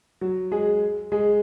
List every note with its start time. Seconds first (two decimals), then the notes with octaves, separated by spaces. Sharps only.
0.21 F#3 F#4
0.51 G#3 G#4
1.12 G#3 G#4